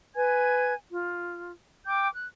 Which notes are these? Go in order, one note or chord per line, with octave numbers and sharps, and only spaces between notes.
B4 G#5 G#6
F4
G5 D6 F6 G6
F#6